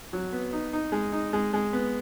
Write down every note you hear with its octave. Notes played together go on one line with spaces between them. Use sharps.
F#3
B3
D#4
D#4
G#3
D#4
G#3
G#3
B3